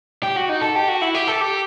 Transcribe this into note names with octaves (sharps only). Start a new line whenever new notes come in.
G4
F#4
D#4
A4
G4
F#4
E4
G4
A4
G4